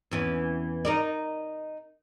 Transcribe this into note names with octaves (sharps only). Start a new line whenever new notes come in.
E2 E3 C#4
D#4 A#4 D5